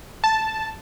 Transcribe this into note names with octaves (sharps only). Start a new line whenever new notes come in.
A5